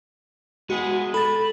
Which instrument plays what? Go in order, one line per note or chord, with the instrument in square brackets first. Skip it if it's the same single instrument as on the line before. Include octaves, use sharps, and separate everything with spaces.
[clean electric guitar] G#3 B3 G#4 [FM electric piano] F#4
[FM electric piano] A4 A6 [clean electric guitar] B5